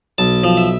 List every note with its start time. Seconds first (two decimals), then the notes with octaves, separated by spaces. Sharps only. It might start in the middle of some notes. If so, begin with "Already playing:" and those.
0.18 B1 A5
0.44 F3
0.57 E5